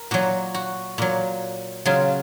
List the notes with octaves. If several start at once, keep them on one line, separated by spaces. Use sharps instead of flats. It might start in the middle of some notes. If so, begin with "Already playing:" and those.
Already playing: A#4
A#2 F#3 F#4
F#4
A#2 F#3
C#3 F#3 F4